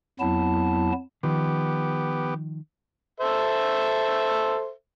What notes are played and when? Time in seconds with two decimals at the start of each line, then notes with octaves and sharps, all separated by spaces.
0.20 F2 F#3 B3 E4 A5
1.23 D#3 F3 B3 G4
3.20 A4 C5 E5